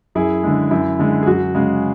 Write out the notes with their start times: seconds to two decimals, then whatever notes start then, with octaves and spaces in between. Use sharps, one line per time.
0.15 F#2 E4 G#4
0.43 D3 G#3
0.71 F#2 E4
0.99 D3 G#3
1.23 G#4
1.27 F#2 F#4
1.55 C#3 G#3